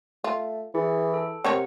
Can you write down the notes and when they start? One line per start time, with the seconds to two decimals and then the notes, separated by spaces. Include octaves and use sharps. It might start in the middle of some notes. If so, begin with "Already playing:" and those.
0.24 A3 F4
0.75 E3 G#4
1.14 A4
1.44 C3 C4 A#4 C#5 F#5